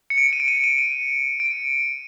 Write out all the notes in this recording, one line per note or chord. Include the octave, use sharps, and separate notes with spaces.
C#7
D7
D#7
D7
D#7
D#7
D#7
D7